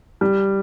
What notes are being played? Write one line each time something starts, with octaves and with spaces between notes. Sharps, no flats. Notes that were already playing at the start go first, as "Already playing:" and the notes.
G3